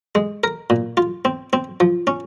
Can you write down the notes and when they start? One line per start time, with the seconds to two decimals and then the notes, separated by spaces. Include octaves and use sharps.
0.15 G#3
0.44 A#4
0.70 A#2
0.97 F4
1.25 C4
1.53 C4
1.80 F3
2.07 C#4